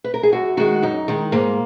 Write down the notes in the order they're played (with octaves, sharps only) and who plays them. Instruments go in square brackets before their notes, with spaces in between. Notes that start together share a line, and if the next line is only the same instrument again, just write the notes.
[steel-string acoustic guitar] B4
A#4
G#4
F#2 F#4
D#3 G#3 F#4
F#2 D#4
D#3 G#3
G#2 A#3